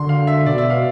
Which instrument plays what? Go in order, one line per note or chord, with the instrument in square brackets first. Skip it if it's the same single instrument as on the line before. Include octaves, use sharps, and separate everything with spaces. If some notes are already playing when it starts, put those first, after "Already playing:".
Already playing: [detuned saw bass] D3 [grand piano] C6
[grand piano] F5
E5
[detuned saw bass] B2 [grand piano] D5
[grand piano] E5
F5